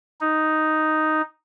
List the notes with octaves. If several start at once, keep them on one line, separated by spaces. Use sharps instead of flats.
D#4